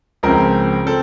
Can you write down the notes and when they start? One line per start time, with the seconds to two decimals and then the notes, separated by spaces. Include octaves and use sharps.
0.23 C#2 C#3 F3 C4 A#4
0.86 C4 A4